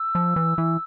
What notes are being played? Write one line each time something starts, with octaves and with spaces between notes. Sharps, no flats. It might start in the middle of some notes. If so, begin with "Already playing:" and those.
Already playing: E6
F3
E3
E3